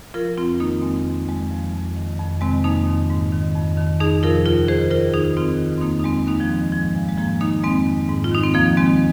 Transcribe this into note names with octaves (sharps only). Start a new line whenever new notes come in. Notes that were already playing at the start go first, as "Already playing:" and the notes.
F3 F4 A#4
F2 C4 F4
D#3 A#3 D#4
F2 G#3 C4
D#3
F2 G#3
F3
F2
D#3
F2
C3 D#3 G#3 C4
F2 A#3 D#4
D#3
G#2
D#3
F2
D#3
F2 D#4 G#4
C3 F3 F4 A#4
D#2 F4 A#4
D#3 G#4 C5
D#2 F4 A#4
D#3 D#4 G#4
D#2 C4 F4
D#3
C4
F2 A#3 D#4
D#4
D#3 G#3 C4
D#2 A#3 D#4
F3
D#3 G#3
G#2 F3
F3 G#3
G#3
G#2 F3 A#3
D#3 A#3 D#4
F2 G#3 C4
D#3
G#2
F4
D#3 D#4
C4
D#2 F3 A#3
D#3 G#3 C4